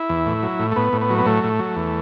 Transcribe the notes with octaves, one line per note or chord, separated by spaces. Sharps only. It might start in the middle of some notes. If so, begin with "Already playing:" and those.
Already playing: E4
E2
A2
F#3
A2
A3
A2 B3
A2
B3
F#3
B3
A2 A3
A2
F#3
E2